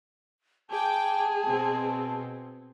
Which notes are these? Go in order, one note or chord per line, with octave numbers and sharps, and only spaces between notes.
G#4 G5 A5 D6
B2 C4